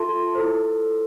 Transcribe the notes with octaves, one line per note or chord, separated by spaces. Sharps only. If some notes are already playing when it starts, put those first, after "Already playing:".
Already playing: F4 A4 E5 A5 C6
E4 A4 C5